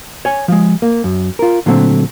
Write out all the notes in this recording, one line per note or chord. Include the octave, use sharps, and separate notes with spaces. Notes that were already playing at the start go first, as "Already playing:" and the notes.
C#5 G#5
F3 G#3
A#3
F#2
F4 A#4
A#2 D3 F#3 A3 C4